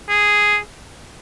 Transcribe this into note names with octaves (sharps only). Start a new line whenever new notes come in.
G#4